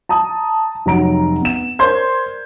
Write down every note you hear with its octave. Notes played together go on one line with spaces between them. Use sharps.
A5 A#5 D#6
F1 F#3 A#5 D7
B3 E7
A#4 C5 D5 C6 G6 G#6